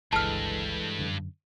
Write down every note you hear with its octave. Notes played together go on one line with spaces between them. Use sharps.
G1 C#2 G2 E3 G#3 A4 A5 F6
F#2 D3